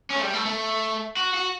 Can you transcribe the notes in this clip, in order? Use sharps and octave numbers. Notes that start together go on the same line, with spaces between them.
C#4
A3
G3
A3
A3
F#4
F#4